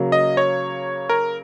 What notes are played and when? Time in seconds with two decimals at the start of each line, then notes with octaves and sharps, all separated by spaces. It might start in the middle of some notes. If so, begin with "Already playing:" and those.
Already playing: C#3 F#3 A#3
0.12 D#5
0.37 C#5
1.10 A#4